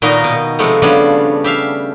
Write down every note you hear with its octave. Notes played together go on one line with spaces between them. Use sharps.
A#2 D#3 B3 D#4 F#4 A#4
B2
C3 F3 G#3 A3 B3
C#3 F3 G3 B3 D4
G4 E5 F5